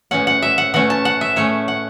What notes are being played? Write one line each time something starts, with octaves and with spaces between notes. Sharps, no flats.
A2 E3 C#4 F#5
F#5
E5
F#5
E3 A3 C#4 F#5
A5
F#5
E5
A2 A3 C#4 C#5
F#5